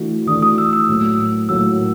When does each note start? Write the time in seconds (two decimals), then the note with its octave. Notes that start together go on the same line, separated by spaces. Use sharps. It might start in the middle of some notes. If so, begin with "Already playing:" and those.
Already playing: E3 A3 D4 F#4
0.27 E3 A3 D4 F#4 D#6
0.42 D#6
0.58 E6
0.73 E6
0.89 A2 F#3 A#3
1.49 A2 F#3 A#3 E6